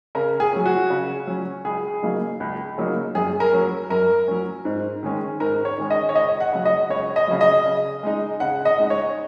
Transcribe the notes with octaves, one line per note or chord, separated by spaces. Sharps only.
C#3 A#4
G#4
F#3 C#4
F#4
C#3
F#3 C#4
C#2 G#4
C#3 F#3 A#3 D#4
C#2
C#3 F#3 A#3 D#4
F#2 G#4
A#4
F#3 C#4
F#2 A#4
F#3 C#4
G#2
D#3 G#3 C#4
G#2 A#4
C#5
D#3 G#3 C#4
D#5
C#5
C#2 D#5
F#5
C#3 F#3
D#5
C#2 C#5
D#5
C#3 F#3
D#5
C#3
G#3 D#4
C#3 F#5
D#5
G#3 D#4
C#5